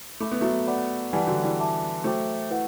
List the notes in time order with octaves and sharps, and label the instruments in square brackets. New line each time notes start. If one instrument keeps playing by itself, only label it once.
[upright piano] A3 [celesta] A4 E5 B5 D6
[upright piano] B3
F#3 A3
[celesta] B4 D5 F#5 B5 D6
[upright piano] E3 G3 [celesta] E4 B4 F#5 A5
[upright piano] D3 F#3
E3 G3
[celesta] B4 E5 A5 D6
[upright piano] F#3 A3 [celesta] C5 E5 G5 D6
[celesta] E4 B4 F#5